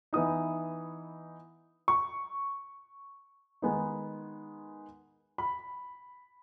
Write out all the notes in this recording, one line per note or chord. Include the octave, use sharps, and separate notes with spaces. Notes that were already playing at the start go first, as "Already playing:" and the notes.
E3 B3 D#4 D#6
C#6
D#3 G#3 B3 D#4
B5